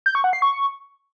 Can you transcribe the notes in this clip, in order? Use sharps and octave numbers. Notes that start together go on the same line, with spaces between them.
G6
C#6
F#5
C7
C#6